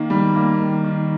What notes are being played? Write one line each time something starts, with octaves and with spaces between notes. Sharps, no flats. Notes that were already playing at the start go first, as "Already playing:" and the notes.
Already playing: D#3 A#3
G3
A#3
D#3
D#3